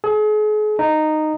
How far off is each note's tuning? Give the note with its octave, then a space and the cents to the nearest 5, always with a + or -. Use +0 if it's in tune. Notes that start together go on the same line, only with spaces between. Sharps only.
G#4 +40
D#4 -10